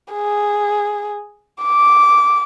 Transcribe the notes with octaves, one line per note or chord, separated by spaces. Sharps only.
G#4
D6